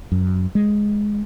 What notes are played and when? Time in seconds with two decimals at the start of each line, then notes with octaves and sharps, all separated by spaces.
0.12 F#2
0.55 G#3